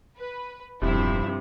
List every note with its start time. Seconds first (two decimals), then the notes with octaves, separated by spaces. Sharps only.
0.17 B4
0.82 E1 G2 C3 F3 C4 E4